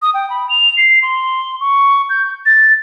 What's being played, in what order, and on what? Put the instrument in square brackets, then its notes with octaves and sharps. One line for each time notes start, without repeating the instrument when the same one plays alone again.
[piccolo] D#6
G5
B5
F7
C7
C6
C#6
G6
A6